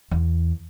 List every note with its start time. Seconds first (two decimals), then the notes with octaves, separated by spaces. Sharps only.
0.11 E2